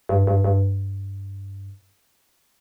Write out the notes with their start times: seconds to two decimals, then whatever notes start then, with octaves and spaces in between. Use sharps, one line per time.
0.09 G2
0.27 G2
0.44 G2